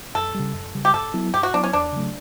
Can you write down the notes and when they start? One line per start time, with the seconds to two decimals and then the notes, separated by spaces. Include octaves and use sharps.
0.15 F#2 A4
0.35 C#3 G3
0.54 F#2
0.74 C#3 G3
0.85 G4
0.94 G2 A4
1.14 F#3 B3 E4
1.34 G2 G4
1.43 F#4
1.54 F#3 B3 D4 E4
1.64 C#4
1.73 E2 D4
1.92 C#3 F#3 A3